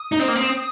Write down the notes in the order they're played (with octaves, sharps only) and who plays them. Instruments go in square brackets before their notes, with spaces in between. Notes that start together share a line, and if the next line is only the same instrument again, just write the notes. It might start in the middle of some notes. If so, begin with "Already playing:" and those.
Already playing: [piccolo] D#6
[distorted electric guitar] D#4
C4
A#3
C4